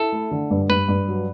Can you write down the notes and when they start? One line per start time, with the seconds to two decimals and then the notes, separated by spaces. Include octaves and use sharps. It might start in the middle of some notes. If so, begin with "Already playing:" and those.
Already playing: E4 A4
0.12 A3
0.31 D3
0.50 G2
0.70 G2 B4
0.88 G2
1.08 F#3